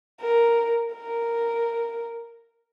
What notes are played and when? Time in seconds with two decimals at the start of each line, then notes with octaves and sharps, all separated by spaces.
0.21 A#4
0.94 A#4